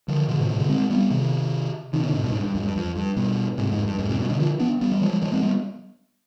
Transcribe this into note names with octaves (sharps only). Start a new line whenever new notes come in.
D3 F3
B2 D3
G#2 C3
G#2 C3
B2 D3
G#3 C4
G3 B3
C3 D#3
C3 D#3
B2 D3
G#2 C3
G2 B2
G#2
G2
G2
F2 G#2
G2
F2
G2
G2 B2
G#2 C3
F2 G#2
G2
F2 G#2
G#2 C3
G2 B2
B2 D3
D3 F3
B3 D4
G3 B3
G3
F3 G#3
F3 G#3
G#3 C4
G3 B3